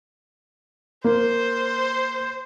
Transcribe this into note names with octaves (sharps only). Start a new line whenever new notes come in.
A#3 C5